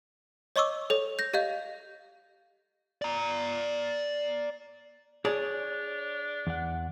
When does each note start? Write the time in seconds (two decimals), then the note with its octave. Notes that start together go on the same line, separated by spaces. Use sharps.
0.56 C#5 D#5 C#6 D6 E6
0.90 A4 C#5
1.19 G6 A#6
1.34 G4 D#5 F5 G6
3.02 D5 A#5
5.25 D4 G#4 C#5 D5 A5
6.47 E2 F#5